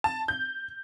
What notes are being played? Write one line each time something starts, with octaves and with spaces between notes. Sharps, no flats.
A5
G6